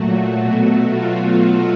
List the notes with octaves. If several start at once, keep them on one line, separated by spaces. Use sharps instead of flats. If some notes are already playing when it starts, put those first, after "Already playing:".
Already playing: A#2 F#3 A3 F#4
B2 F#3 A3
F4
F#4